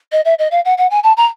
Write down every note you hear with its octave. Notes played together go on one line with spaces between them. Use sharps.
D#5
E5
D#5
F5
F#5
F#5
G#5
A5
A#5